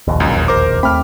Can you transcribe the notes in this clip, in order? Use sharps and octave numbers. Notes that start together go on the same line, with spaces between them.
E1 A#1 D#2
C#2 F#2
A#4 C5 D6
D#2 A3 C4 B5 F6